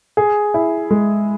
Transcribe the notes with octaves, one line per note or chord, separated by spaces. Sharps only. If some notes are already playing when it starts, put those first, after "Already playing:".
G#4
E4
G#3